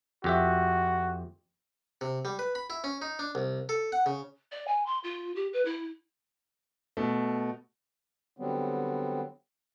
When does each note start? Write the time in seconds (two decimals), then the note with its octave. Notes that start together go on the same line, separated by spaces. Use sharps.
0.24 F2 F#4 G4 E5
2.01 C3
2.25 G3
2.39 B4
2.55 B5
2.70 E4
2.84 C#4
3.02 D#4
3.19 D4
3.35 C2
3.69 A4
3.92 F#5
4.06 C#3
4.52 D5
4.67 G#5
4.86 C6
5.03 F4
5.36 G4
5.53 B4
5.65 E4
6.97 B2 A3
8.37 D3 F#3 G3 B3 C4